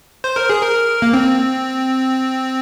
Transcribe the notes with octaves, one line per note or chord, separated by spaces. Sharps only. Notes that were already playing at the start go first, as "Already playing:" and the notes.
C5
A#4
G#4
A#4
A#3
C4